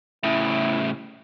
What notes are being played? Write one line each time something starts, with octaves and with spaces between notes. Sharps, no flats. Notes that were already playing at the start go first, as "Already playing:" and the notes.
A2 C#3 E4